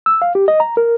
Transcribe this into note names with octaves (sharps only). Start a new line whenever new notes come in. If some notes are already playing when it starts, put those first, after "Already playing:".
E6
F5
G4
D#5
A#5
A#4